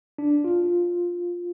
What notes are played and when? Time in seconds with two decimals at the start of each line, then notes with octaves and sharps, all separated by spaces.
0.18 D4
0.44 F4